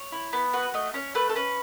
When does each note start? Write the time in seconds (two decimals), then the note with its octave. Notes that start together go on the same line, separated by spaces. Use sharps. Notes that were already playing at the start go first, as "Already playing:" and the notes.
Already playing: C#5
0.12 E4
0.33 B3
0.53 F#4 B4
0.74 A3 D#5
0.94 C#4 C#5
1.15 A3 B4
1.29 A4
1.35 C#4 B4